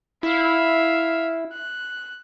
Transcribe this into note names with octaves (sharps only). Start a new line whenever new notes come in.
E4 E5 F5
F#6